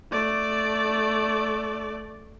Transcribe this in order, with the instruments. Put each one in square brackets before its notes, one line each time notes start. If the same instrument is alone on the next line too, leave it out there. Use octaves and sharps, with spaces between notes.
[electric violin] A3 D5